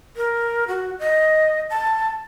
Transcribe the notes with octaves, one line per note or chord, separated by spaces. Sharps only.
A#4
F#4
D#5
A5